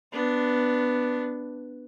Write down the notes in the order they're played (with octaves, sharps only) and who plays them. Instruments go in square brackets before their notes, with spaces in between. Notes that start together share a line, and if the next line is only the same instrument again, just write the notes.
[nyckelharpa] B3 D4